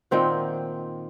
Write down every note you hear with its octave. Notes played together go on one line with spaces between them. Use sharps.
A#2 D#3 C4 F#5